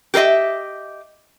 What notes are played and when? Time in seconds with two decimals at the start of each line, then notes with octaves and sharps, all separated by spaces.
0.14 G4 A#4 C5 D#5 E5